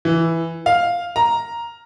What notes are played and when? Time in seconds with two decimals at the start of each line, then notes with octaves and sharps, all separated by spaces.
0.05 E3
0.66 F5
1.16 A#5